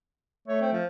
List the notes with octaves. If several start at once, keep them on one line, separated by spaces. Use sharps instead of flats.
A3 C#5
C4
F3